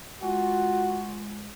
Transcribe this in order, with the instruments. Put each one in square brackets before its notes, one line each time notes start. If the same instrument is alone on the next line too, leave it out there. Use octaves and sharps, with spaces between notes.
[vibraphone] G#3 [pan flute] F4 [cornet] F#4